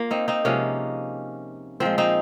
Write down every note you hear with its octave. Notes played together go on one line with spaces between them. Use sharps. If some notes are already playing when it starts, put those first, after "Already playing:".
Already playing: A#3 F4
C4 D#4
C4 D#4
C3 F3 G#3 A#3 C#4
A#2 F3 G#3 C4
C4 D#4